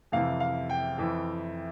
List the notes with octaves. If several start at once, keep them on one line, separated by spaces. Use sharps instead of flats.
F2 C3 E3 F5
F5
G5
F2 E3